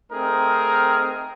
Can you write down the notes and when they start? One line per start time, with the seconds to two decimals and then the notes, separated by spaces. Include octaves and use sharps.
0.12 A3 C4 D#4 G#4 A#4